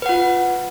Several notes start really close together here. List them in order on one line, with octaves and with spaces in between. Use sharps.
B4 F#5 F4